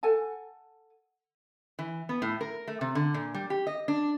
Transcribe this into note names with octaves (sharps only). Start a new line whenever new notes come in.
A4 F#5 G#5 A5
E3
B3
A2
A#4
A3
C3
D3
A#2
G3
G4
D#5
D4